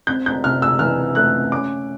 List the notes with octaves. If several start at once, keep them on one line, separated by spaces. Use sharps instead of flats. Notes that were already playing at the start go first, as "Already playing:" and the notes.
C4 G6
G6
C3 F6
E6
E3 F6
A3 F#6
C#4 D6